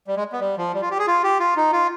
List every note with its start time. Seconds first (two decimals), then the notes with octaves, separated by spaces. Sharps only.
0.07 G3
0.16 G#3
0.33 B3
0.41 G3
0.57 F3
0.74 G3
0.81 F4
0.90 G4
0.99 G#4
1.07 F4
1.23 G4
1.39 F4
1.56 D#4
1.73 F4